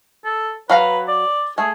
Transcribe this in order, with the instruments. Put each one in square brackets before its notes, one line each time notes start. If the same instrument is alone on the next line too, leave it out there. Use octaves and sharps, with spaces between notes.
[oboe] A4
[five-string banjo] F#3 F5 A#5 [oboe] B4
[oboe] D5
[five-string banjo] A3 [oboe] G#4